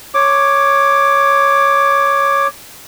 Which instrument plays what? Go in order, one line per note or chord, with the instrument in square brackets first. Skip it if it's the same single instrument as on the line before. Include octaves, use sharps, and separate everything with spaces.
[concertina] C#5 D6